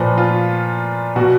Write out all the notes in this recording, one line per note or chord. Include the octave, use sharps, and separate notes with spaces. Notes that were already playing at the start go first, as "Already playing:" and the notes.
Already playing: A#2 F3 B4
F4
B2 F#4